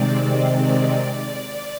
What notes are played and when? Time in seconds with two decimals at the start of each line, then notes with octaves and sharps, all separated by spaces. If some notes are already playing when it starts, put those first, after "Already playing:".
Already playing: C3 D#3 G#3 C4 D5
0.62 D5